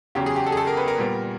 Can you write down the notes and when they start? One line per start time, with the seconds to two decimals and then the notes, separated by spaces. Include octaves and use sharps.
0.15 E2 C#3 F#3 G4
0.26 G#4
0.36 G4
0.46 A4
0.52 G#4
0.57 A4
0.67 A#4
0.77 B4
0.88 A#4
0.98 A#2 G3 B3